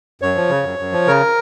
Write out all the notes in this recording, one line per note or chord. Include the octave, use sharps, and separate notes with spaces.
F#2 C#5
F3
C#3
F#2
F#2
F3
C#3 A#4